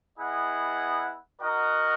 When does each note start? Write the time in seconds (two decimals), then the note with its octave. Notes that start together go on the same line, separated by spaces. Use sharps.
0.18 B3 E4 G#4 D#5 F#5
1.40 D#4 F#4 A#4 D#5 F#5